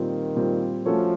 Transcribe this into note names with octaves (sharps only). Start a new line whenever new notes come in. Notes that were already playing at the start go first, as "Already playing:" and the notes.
Already playing: A#2 D#3 G3 C4 F4
A#2 G3 C4 F4
F3 A3 C#4 F#4 A4 C#5